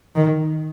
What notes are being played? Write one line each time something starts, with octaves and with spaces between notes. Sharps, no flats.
D#3